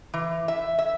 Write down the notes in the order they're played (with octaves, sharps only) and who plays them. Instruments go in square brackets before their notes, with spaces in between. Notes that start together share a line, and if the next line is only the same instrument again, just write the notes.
[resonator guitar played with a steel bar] E3
E5
E5